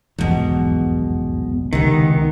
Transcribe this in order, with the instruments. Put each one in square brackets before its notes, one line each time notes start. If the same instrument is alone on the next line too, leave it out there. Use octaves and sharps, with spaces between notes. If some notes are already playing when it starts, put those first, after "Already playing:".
[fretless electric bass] F1 B1 G#2 [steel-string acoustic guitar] E2 B2
[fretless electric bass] C#2 [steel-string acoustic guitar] C3 B3 [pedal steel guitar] D#3